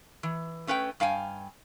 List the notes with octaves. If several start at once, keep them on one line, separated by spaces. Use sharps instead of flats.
E3
A3 C#4 B4 F#5 G5
G2 F5 G5 G#5